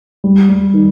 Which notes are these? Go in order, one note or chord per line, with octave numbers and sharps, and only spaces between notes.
G3
G3
D#3